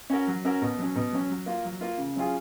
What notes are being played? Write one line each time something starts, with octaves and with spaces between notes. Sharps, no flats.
C#4 F#4 A#4
F#3
C#4 F#4 A#4
B2
F#3 C#4
B2
F#3 C#4
F#3
A#3 F4
F#3
A#3 F4
C#3
F#3 C#4 F4 G#4